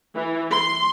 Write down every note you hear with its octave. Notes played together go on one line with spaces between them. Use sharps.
E3
C6